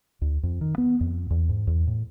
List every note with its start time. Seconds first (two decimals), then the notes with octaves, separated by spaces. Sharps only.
0.21 D2
0.43 F2
0.61 D#3
0.78 B3
1.01 F2
1.30 E2
1.49 G#2
1.67 E2
1.87 A2